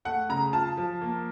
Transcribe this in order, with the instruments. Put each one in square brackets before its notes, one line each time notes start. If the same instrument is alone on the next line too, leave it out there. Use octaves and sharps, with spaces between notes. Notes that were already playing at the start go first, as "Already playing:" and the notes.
[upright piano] A3 F#5
C#3 A#5
F4 A5
F3
A#3